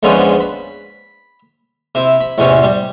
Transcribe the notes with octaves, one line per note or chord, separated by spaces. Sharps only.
E2 G#2 D3 F3 B3 C#4
B5
C3 E4
B5
A1 E2 C3 C#4
G3